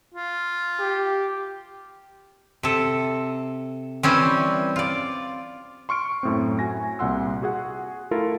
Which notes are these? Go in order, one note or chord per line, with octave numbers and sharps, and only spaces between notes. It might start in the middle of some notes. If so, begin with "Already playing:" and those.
F4
G4
C3 A4
E3 G3 C4 C#4
F4 D5
C6 C#6 F6 D7
F#2 A2 C4
F#4 G#5 A#6
C2 A#2 F#5 C6 E6
F#4 G#4 F#5
A3 E4 F4 A4 A#4